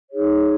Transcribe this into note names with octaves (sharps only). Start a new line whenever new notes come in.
D#4 G#4 C#5